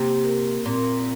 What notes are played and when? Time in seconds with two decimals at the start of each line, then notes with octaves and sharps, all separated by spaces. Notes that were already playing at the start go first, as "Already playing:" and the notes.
Already playing: C3 A#3
0.24 A#4
0.66 A#2 C4